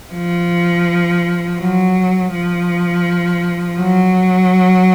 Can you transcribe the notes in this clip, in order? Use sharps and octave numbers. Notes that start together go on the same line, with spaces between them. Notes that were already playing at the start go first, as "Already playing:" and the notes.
F3
F#3
F3
F#3